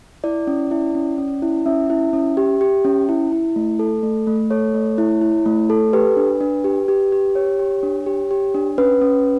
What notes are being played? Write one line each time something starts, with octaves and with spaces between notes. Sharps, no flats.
E4 D5
C#4
E4
C#4
C#4
E4
C#4 E5
E4
C#4
G4
G4
C#4
E4
E4
A3
A4
A3
A3
A4 C#5
A3
E4
E4
A3
A4
G4 B4
D4
D4
G4
G4
G4
G4 C#5
G4
D4
G4
G4
D4
C#4 B4
C#4